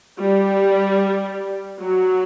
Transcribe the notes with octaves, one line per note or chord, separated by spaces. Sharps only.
G3
F#3